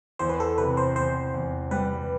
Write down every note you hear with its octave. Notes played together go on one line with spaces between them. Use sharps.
E2 C5
B4
A4
C3 B4
C5
E2 C5
E2
G3 B4